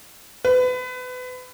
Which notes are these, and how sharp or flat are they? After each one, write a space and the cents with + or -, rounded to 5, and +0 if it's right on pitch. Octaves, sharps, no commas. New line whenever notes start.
B4 +30